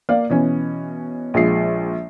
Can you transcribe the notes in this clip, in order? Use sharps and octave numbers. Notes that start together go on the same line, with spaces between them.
A#3 D5 F5
B2 E3 C#4
A#1 F3 G#3 C7